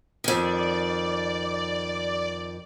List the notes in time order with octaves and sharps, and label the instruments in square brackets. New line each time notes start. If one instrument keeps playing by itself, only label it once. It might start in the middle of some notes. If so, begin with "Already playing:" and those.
[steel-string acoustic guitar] F2 D#3 [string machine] D5